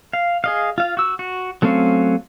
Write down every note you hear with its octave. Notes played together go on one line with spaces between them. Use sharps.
F5
G#4 D#5 F5
F4 F5
F#4 E6
F#4
F#3 A3 C4 C#4 F5